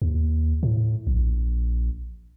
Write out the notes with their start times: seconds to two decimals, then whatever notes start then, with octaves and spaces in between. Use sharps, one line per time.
0.02 D#2
0.63 A2
1.07 A#1